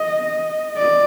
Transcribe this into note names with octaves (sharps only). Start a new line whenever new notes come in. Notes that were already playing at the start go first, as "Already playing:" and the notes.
Already playing: D#5
D5